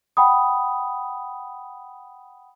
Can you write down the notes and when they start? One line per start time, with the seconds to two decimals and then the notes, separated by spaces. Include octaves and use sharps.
0.17 F#5 G5 B5 D#6